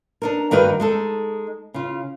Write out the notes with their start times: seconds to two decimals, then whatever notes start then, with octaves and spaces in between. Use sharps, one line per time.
0.22 D4 D#4 A#4
0.51 G2 D#3 F#4 A#4 B4 D#5
0.80 G#3 D#4 A4
1.74 C#3 F4